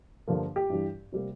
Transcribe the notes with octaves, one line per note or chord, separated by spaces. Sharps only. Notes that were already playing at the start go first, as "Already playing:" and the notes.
G2 D3 F3 A#3
G4
G2 E3 G3
C3 G3 A#3